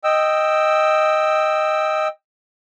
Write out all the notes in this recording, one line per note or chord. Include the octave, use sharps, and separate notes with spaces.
D#5 G5 E6